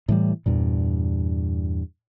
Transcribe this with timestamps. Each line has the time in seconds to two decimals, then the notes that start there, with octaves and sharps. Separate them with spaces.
0.08 A2 E3 G3
0.46 E2 G2 A#2